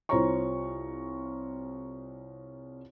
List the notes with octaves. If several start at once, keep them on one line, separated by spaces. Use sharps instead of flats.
C2 F4 C5 C#5 A#5 C#6